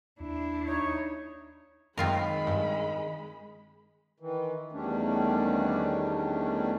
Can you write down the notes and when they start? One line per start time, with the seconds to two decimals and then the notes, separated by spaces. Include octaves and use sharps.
0.20 D#2 D4 E4
0.67 D#4 C#5
1.97 F#2 D#3 G#3 C4 F4 A#4 B5
2.47 G2
4.20 D#3 E3
4.72 E2 D#3 G3 A3 C#4 D4